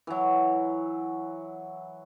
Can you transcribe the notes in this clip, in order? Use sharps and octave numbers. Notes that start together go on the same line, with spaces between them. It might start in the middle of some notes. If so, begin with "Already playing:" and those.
E3 F#3